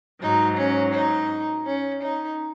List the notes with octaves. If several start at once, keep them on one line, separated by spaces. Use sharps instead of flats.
G#2 F#3 D#4
C#4
D#4
C#4
D#4